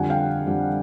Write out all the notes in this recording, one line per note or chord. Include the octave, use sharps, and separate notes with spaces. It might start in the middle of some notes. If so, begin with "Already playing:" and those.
Already playing: F2 D3 G3 F#5 G#5
F5 G5
F2 D3 G3